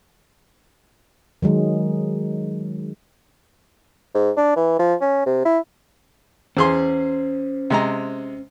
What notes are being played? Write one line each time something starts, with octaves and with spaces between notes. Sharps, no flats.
D#3 F#3 G#3
G#2
D4
E3
F3
C#4
C3
E4
E2 C#4 G#4 C5 C6
C3 G#3 A#5